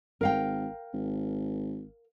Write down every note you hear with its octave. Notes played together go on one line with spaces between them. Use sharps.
G#1 A#4 F5 G5
G#1